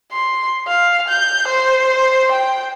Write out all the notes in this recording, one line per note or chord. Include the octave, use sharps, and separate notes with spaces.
C6
F5
G6
C5
G5